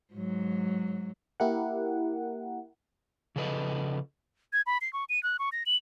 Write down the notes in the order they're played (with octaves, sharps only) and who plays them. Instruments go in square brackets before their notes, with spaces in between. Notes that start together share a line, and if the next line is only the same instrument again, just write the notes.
[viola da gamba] G#2 F#3
[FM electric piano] A#3 E4 G4 A#4 F#5
[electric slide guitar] C#3 F3 A4 B4 D#5
[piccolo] G#6
B5
C7
C#6
D#7
F#6
C#6
A#6
F#7